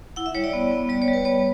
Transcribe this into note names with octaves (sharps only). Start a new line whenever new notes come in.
E4 F#5
E5
G3 C#5
D5
B3
B3
G3 D5
C#5
G3
B4
B3 C#5